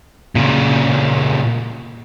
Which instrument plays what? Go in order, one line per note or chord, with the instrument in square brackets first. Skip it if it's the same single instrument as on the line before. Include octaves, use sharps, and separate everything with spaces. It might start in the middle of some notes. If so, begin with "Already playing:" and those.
[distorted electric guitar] A#2 C#3